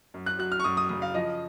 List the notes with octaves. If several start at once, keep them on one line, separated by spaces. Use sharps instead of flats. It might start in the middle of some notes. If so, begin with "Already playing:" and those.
F#2
F#6
F#3 F#6
F6
C#6
F#2 D#6
D#6
C#3 D#6
F5
F3 D#5